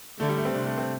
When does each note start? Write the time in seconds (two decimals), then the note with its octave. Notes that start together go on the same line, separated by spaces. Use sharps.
0.19 D3 A3
0.28 G3
0.37 A3
0.45 C4
0.54 C3 D4
0.66 A3
0.78 C4